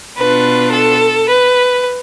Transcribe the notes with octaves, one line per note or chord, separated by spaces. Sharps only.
B2 B3 D4 F4 B4
A4
B4